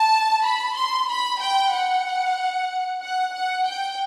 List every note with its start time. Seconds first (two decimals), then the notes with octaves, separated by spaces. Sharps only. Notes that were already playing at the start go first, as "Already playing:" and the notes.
Already playing: A5
0.44 B5
0.76 C6
1.09 B5
1.41 G5
1.73 F#5
3.02 F#5
3.34 F#5
3.66 G5